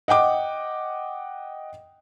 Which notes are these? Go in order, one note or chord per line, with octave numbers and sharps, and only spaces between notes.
D#5 F#5 G5 D6